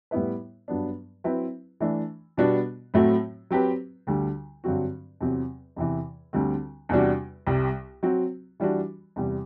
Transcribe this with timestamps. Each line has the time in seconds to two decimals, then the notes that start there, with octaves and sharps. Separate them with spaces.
0.11 A2 G3 B3 E4 B4
0.68 G2 F#3 B3 D4
1.24 F#3 C4 E4 B4
1.80 E3 A3 D4
2.37 B2 G3 B3 D4 F#4
2.94 A2 F#3 A3 C4 F#4
3.51 F#3 C4 G4 B4
4.07 D2 D3 G3
4.64 G2 D3 F#3 C4 F#4
5.20 E2 C3 F#3 C4 G4
5.76 E2 C3 E3
6.33 D2 D3 G3 C4
6.89 E2 C3 G3 D4 F#4
7.47 C2 C3 G3
8.03 F#3 C4 F#4
8.60 E3 G3 D4 F#4
9.16 E2 C3 G3